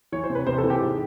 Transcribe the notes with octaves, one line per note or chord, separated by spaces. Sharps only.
E3 C#5
C5
C3
B4
C3 C5
A4
E3
G4
G#2